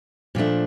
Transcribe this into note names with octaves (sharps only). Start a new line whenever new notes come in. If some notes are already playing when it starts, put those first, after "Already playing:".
A#2 F3 A3 D4